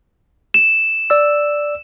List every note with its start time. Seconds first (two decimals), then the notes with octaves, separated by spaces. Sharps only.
0.54 E7
1.10 D5 E6